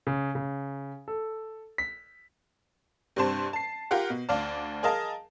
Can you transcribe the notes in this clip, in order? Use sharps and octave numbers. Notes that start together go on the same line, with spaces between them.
C#3
C#3
A4
B6
G2 C3 G3 D4 C5 A5
A5 C7
F4 G4 A#4 F#5
B2
D2 D5 F5 A5
G#4 A#4 D#5 F5 A5